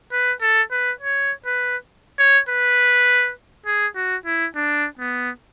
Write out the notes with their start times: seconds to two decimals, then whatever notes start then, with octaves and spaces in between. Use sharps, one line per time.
0.12 B4
0.41 A4
0.71 B4
1.01 C#5
1.46 B4
2.19 C#5
2.49 B4
3.66 G#4
3.95 F#4
4.26 E4
4.55 D4
4.99 B3